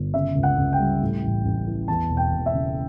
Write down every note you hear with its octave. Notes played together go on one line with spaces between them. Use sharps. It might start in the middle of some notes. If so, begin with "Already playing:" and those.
Already playing: G1
C#3 E5
C#2
F#5
C#2
G5
G3
A2
A1
A1
E3
E2 A5
E1
G5
E1
E5
C#3